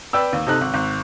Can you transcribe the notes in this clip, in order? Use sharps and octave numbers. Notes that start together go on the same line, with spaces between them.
B4 D5 G5 E6
D#2
C3 D#4 A4 F#6
G#1
G#1